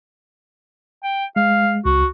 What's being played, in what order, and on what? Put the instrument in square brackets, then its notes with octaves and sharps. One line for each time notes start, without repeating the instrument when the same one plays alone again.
[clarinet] G5
[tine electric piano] G#3 [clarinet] F5
[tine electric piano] C#2 [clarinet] F#4